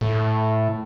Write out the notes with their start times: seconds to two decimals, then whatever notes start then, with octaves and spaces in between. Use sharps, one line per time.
0.01 A2